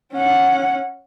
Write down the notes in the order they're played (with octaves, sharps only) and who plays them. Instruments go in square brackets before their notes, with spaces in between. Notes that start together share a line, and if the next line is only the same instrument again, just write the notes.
[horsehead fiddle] C#4 F#5